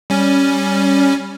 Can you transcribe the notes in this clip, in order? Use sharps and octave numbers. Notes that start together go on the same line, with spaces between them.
G3 C#4